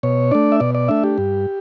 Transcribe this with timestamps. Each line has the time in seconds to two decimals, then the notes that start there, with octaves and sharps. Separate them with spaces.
0.03 B2 C#5
0.31 A3 D4 D5
0.52 E5
0.60 B2 D5
0.75 D5
0.88 A3 D4 E5
1.04 G4
1.18 G2